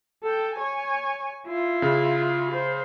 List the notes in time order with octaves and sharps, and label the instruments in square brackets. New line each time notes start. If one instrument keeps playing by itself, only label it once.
[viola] A4 G5
C#5 G#5
E4 F4
[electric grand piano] C#3
[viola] C5